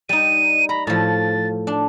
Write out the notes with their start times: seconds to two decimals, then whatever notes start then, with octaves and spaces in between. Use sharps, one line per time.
0.09 G3 D#4 D#7
0.69 A#5 B5
0.87 A2 F3 A6
1.67 D4